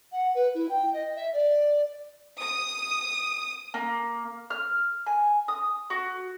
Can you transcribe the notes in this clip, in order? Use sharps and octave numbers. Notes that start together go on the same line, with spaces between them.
F#5
B4
E4
G5
D#5
E5
D5
D#6
A#3
F6
G#5
D#6
F#4